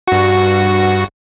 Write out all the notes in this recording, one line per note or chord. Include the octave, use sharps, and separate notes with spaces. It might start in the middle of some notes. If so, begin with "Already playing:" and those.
G2 F#4